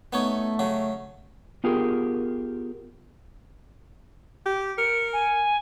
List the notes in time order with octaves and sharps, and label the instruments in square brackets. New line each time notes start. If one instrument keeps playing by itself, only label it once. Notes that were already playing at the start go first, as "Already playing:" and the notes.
[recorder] A3 [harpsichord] B3 D#4 C#5
[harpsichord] C#3 F#3
[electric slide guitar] B3 F4 G4 G#4 A#4
[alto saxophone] G4
[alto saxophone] A#4 [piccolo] C#7
[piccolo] G#5